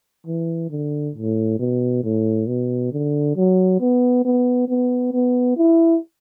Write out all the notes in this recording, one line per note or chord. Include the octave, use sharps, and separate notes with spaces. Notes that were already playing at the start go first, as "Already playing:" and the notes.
E3
D3
A2
B2
A2
B2
D3
F#3
B3
B3
B3
B3
E4